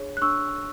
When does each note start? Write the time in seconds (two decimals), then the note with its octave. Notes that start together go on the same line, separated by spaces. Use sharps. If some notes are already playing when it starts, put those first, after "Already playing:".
Already playing: D4 G#4 C#5
0.17 F#6
0.22 D4 C#6 E6